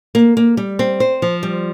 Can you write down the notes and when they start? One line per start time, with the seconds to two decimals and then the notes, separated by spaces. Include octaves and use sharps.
0.15 A#3
0.37 A#3
0.57 G3
0.79 C4
1.00 C5
1.22 F3
1.43 G3